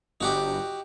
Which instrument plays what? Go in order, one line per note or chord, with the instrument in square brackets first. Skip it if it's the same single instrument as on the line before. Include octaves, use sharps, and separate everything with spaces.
[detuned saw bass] G1 [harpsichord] D#4 F#4 G4